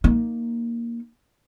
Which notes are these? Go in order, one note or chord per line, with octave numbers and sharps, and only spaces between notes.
A#3 D#4